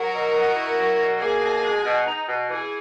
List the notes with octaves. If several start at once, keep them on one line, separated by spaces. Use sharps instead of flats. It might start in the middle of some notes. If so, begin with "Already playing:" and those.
Already playing: F#3 F#4 A#4
B2
B3
E4
F#3
B2
A#3 G#4
B2
G#3
B2
D#4
B2
E3 G#4